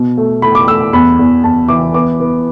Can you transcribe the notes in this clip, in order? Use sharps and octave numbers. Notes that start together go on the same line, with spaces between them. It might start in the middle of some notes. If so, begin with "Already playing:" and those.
Already playing: B2
A3
A3 B5
D6
A3 E6
E2 B5
E2
E2 A5
E3 D6
B3 D6
B3